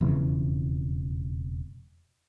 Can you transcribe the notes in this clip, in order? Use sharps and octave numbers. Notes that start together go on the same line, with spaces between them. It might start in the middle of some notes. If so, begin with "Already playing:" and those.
E1 F2 C#3 E3